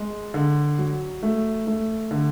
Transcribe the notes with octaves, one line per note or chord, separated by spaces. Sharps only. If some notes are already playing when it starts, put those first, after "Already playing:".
Already playing: G#3
D3
F#3
A3
A3
D3